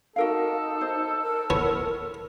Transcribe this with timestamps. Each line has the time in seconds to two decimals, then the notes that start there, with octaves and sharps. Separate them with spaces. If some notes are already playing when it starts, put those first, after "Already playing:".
0.16 D#4 F#4 A4 A#4 F5
0.81 C5
1.22 A#4
1.50 B3 E4 C#5